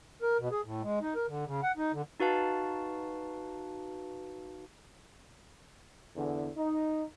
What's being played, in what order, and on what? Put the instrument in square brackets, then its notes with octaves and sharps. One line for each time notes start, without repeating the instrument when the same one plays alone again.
[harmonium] A#4
B2
G#4
A2
G#3
D#4
A#4
D3
C#3
F#5
D#4
D3
[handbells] D#4 F#4 B4 F5 A5
[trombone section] E2 D3
D#4